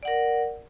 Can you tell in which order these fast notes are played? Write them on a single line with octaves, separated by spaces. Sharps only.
D5 F#5 A#4